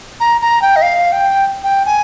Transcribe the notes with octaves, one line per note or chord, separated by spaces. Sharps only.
A#5
A#5
G5
D#5
F5
G5
G5
G#5